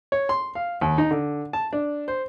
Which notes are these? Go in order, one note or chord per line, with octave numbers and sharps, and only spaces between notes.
C#5
C6
F5
D#2
D#4
D3
A5
D4
C5